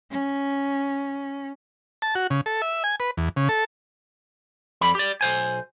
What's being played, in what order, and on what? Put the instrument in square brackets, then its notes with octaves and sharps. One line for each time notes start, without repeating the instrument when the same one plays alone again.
[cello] C#4
[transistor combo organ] A5
F#4
C#3
A4
E5
G#5
B4
E2
C#3
A4
[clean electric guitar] F2 D5 B5
G4 D5
B1 C5 G#5